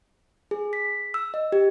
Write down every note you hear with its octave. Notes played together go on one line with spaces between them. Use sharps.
G#4
B6
E6
D#5
G4